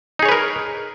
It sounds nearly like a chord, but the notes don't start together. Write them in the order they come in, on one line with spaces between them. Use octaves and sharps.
D#4 G#4 C#5 B4 A#4